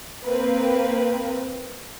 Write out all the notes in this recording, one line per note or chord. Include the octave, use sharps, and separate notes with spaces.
A#3 C4 B4